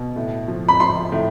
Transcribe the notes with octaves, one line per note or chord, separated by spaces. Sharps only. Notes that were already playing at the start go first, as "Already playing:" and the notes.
Already playing: B2
A2
F3
B5
F3 C6
A2